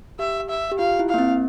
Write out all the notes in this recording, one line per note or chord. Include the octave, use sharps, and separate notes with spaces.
G4 E5
E5
G4
F4 F5
E4
A#3 F5
C4